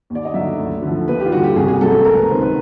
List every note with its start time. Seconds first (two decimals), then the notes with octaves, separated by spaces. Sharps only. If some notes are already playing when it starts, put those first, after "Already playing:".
0.10 D#2
0.15 D5
0.25 D#5
0.34 D3 F#3 E5
0.58 D2
0.82 D3 F3
1.07 D#2 B4
1.20 G4
1.25 F4
1.32 D3 G3 F#4
1.44 G4
1.56 C2 G#4
1.68 G#4
1.81 A#2 F#3 A3 A4
1.93 A4
2.04 C#2 A#4
2.17 B4
2.29 C3 D#3 C5
2.41 B4